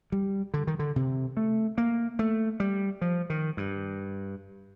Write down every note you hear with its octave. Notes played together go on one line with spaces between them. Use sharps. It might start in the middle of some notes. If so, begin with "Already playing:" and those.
G3
D3
D#3
D3
C3
A3
A#3
A3
G3
F3
D#3
G2